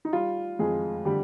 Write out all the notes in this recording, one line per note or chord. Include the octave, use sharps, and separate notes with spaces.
D#4
G3 F4
F2 G#3 G#4
D3 G3 G4